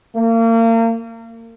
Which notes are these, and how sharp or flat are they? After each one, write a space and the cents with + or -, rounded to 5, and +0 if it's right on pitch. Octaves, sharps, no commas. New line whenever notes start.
A#3 -35